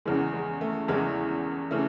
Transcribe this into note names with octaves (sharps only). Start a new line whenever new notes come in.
E2 C#3 E3 G#3
G#3
A3
E2 C#3 E3 G#3
C#3 E3 A3